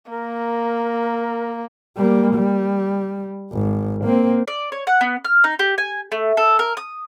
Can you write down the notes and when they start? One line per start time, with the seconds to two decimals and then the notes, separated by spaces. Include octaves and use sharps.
0.11 A#3 A#4
1.96 G3 A#3
2.34 G3
3.52 G#1
4.04 A#3 C4
4.48 D5
4.72 C#5
4.87 F#5
5.01 B3
5.25 F6
5.44 D#4
5.59 G4
5.78 G#5
6.12 A3
6.37 A4
6.59 A#4
6.77 D#6